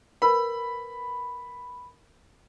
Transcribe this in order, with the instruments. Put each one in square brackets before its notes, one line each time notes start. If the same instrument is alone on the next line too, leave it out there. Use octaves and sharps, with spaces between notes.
[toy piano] A#4 B4 [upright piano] B5